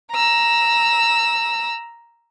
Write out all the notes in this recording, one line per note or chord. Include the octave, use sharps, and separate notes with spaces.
A#5 E6